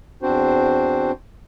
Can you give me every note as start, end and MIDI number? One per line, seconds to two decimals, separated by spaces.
0.22 1.12 40
0.22 1.12 60
0.22 1.12 62
0.22 1.12 66
0.22 1.12 72